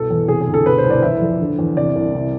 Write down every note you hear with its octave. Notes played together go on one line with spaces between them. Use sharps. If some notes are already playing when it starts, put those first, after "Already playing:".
Already playing: C2 B2 A4
E2
C3 G#4
G#4
D2
A4
B2 B4
C5
C2
D5
E3 E5
F2
D3
E2
C3 D5
C2
C3